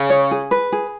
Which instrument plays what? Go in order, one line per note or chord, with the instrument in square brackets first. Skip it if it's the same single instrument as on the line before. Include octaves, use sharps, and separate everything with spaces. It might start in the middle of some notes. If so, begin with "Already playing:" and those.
Already playing: [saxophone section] C#3
[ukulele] C#5
G#4
B4
G#4